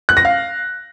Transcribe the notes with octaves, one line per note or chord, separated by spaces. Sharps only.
F#6
A#6
F5